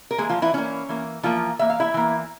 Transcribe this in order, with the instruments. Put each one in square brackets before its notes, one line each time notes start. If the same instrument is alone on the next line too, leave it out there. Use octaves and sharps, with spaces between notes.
[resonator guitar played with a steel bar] A#4
E3 G#3 A#3 G#4
F3 F4
E3 E4
E3 A#3 C#4
E3 A#3
E3 F3 A#3 F4
E3 A#3 E5
F5
E4 E5
E3 A#3